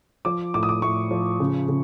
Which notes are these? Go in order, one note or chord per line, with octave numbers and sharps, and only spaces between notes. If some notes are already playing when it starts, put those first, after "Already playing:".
F3 D6
A2 D6
D#6
D6
A2 C#6
F3
C#3
C#3